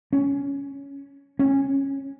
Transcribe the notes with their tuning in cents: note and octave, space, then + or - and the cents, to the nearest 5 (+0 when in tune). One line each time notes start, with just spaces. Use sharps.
C#4 +10
C#4 -15